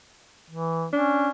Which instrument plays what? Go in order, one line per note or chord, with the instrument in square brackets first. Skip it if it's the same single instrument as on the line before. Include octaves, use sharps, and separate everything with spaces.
[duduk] E3
[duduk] C#4 [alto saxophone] D4